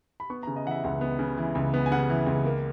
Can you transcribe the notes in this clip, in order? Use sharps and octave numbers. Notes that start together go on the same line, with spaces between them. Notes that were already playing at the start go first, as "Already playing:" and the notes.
B5
B3 C#6
A#5
C#3
D#5
E3 F#5
E5
C#2 F#5
B3
C#3
E3
C#2
B3
G#5
C#3 F#5
E3
C#2
A#3